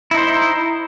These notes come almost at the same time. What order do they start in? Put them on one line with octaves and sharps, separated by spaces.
E4 D#4 C5